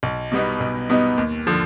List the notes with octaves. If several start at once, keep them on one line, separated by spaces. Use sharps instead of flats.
B1
B2 G3 B3 D#4
B1
B2 G3 B3 D#4
D#2
D3 F3